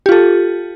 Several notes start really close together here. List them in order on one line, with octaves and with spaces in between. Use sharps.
G4 F4 A4